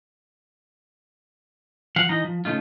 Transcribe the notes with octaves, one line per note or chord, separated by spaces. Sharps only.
F3 F5 F#5
E3 D#4 D#5 A#5
F3
C#3 A3 D#4 F4